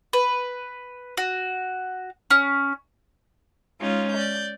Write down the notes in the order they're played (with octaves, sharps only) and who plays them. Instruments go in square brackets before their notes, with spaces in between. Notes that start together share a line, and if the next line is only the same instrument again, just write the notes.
[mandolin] B4
F#4
C#4
[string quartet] G#3 C#4 D#4 F4
D5 G6